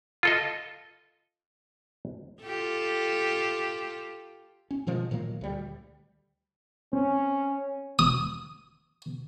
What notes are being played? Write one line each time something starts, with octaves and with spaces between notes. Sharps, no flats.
F4 A4 D#5
F4 G4 A4
C#4
B2 D#3 F3 G#3
A#2 D#3 F#3 A#3
D2 G3
C4 C#4
D#6